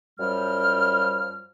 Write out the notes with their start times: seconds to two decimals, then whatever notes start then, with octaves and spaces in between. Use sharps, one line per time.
0.19 F#2 F3 G3 F6